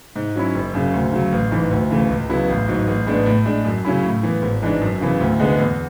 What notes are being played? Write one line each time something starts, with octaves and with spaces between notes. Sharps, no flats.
G#2
F#3 C#4 E4
F#1
F#2 C#3
D2
C#3 F#3
A1
G#2 E3
D2
C#3 E3 A3
C#2
C#3 F#3 B3 E4
A1
G#2 F#3
A1
A2 G#3 B3 D4
A2
G#3 D4
F#2
C#3 F#3 C#4 E4
A2
E3 B3
G#1
G#2 E3 G#3 D4
F#2
C#3 E3 B3 E4
D2
D3 G#3 B3
E2